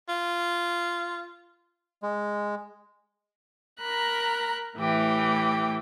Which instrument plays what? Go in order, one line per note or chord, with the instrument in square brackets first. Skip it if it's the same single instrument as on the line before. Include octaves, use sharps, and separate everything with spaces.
[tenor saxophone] F4
[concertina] G#3
[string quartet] A#4 A#5 B5 F#6
A2 E3 G4